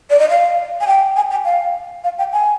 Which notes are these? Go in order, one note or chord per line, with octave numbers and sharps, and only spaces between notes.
D5
D#5
F5
G#5
G5
G#5
G5
F5
F5
G5
G#5